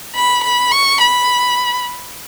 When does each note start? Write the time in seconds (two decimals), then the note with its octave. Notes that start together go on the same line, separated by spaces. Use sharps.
0.15 B5
0.43 B5
0.71 C#6
1.00 B5